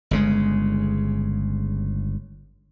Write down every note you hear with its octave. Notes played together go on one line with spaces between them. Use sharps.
G1 C#3 G#3